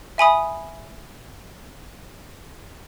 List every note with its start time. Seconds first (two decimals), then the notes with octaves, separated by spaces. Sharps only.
0.18 E5 G#5 B5 D#6